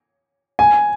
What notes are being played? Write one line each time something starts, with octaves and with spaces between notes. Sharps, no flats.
G#5